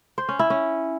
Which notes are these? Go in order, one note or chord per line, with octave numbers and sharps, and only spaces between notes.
C5
C#4
E4
C#4